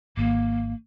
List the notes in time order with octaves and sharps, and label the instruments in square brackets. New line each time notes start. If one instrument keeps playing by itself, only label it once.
[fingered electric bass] G#1 [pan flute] A#3